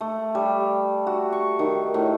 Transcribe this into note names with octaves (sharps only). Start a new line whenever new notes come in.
A3
G3
F#4
C#6
D#3
A2